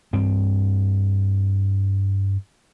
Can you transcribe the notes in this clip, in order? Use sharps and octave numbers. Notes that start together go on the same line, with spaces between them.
G2 C4